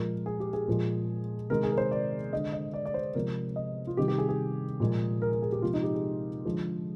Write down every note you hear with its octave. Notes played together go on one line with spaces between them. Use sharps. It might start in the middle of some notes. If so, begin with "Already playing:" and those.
Already playing: A#2 F3 G#3 A#4
G#4
G4
G#4
A#2 F3 G#3
C3 D#3 G#3 A#4
G#4
A#4
C5
D5
D3 G#3 D#5
D#5
D5
D5
C5
C3 F3 G#3 A#4
D#5
F4
C3 D#3 G3 G4
G4
G#4
G#4
A#2 F3 G#3
A#4
A#4
G#4
G4
C3 F3 G#3 F4
D#4
G4
G#4
D3 F3 G#3